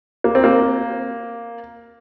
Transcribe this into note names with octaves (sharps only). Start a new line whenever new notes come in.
A#3
C4
A#3